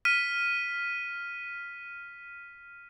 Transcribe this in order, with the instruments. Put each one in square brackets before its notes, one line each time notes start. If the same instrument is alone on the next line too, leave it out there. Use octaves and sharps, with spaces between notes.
[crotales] F6 B6 D#7